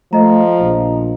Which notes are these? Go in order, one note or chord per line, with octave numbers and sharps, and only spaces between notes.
F3 A3 D#5 A#5
A#1